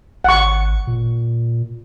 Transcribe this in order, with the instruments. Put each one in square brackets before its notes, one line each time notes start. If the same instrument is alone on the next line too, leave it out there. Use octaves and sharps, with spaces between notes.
[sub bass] G#1 [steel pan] F#5 C#6
[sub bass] A#2